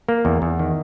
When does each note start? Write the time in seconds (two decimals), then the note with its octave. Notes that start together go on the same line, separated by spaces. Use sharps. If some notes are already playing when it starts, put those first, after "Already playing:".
0.09 A#3
0.25 E2
0.42 E2
0.59 D#3